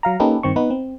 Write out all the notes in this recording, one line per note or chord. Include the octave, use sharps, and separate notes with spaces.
F#3 F5 A#5
A#3 C#4 D#4 G4 A4 B4
G2 D#3 C4 C#6
B3 D#4 B4
C4